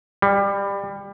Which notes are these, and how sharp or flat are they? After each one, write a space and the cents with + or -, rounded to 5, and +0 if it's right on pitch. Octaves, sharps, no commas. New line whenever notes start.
G3 +20